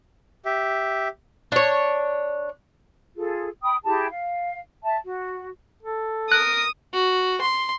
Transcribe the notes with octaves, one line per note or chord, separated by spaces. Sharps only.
G4 E5
D4 C#5
F4 G#4 A4
G5 B5 D#6
E4 G4 G#4 A5
F5
E5 A5
F#4
A4
A#4 D#6 F#6
F#4
C6